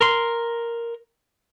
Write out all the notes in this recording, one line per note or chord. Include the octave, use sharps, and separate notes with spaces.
A#4 C6